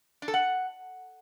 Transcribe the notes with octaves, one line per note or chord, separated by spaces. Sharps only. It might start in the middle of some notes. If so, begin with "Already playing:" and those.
D4
A4
F#5